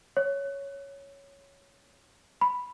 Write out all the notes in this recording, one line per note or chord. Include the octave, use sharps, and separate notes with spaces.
C#5
B5